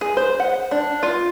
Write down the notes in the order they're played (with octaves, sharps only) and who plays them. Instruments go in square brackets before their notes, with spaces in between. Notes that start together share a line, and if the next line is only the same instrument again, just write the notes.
[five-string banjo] G#4
C5
F#5
D4
F4